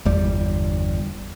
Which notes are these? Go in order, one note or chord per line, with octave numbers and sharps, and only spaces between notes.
G1 E2 G3